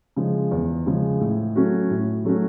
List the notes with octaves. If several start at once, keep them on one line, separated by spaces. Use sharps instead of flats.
C#3 F3 G#3
E2
C#3 F3 G#3
A2
F#3 A3 C#4 F#4
A2
F#3 A3 C#4 F#4